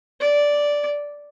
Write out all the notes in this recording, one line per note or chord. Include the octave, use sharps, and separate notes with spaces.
D5